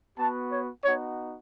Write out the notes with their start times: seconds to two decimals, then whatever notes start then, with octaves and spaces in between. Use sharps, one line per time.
0.17 B3 F#4 A5
0.51 C#5
0.83 B3 D#4 F#4 C#5